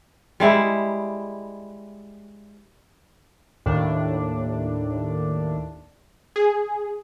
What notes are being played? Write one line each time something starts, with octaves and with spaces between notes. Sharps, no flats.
G3 G#3 E4
D#2 A2 D4
G#4